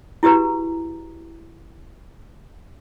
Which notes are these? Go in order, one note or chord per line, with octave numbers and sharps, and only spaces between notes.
E4 F#4 G4 B4 A#5